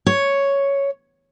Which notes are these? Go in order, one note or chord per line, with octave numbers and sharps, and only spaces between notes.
C#5